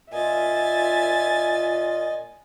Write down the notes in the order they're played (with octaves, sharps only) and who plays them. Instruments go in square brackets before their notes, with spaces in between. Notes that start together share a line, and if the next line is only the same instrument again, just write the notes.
[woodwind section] A#2 F4 [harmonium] D#5 [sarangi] E5 [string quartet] G#5 A6